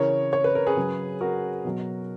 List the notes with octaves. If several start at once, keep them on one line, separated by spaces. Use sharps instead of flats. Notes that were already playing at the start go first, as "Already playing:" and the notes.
Already playing: C#3 E3 A#4 C#5
C#5
B4
A#4
G#4 B4
C#3 F#3
F#4 A#4
B2 F#3